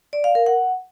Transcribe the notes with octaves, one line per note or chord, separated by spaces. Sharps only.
D5
F5
A#4
F#5